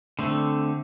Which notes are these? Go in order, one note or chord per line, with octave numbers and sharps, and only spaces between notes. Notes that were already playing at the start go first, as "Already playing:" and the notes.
D3 A3 C4